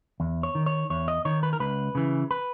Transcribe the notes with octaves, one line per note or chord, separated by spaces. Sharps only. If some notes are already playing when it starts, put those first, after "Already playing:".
E2
C#5
D#3
C#5
E2 C#5
D#5
D#3 C#5
B4
A#4
C#2 B4
C#3 E3
B4